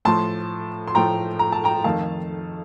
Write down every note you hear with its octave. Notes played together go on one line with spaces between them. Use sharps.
A2 F3 A3 A5 C6
C6
A2 F3 A3 G5 A#5
A#5
A5
G5 A#5
F2 D#3 A3 F5 A5